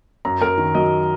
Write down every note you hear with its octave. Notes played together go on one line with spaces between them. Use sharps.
F#2 A#5
F#2 A#4
D#3
F#3 D#5